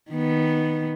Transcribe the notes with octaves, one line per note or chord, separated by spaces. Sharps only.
D#3 B3